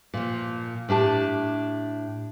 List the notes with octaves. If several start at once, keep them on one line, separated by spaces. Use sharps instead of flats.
A#2 F3
A2 D4 G4 A5